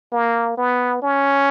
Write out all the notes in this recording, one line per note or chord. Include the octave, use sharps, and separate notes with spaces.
A#3
B3
C#4